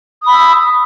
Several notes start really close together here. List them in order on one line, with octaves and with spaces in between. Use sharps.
D#6 B5 E6